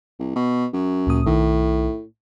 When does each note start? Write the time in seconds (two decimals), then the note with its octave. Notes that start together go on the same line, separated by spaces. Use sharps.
0.19 C2
0.36 B2
0.73 F#2
1.07 D2 A#2 D#6
1.26 B1 A2 D#3